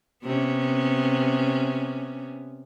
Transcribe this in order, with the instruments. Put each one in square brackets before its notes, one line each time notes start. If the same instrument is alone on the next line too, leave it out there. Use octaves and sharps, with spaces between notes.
[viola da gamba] C3 B3 C#4